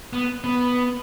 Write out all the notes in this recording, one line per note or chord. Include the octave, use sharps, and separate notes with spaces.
B3
B3